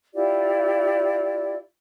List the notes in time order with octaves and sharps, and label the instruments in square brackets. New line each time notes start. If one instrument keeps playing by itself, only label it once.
[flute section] E4 F4 G4 D5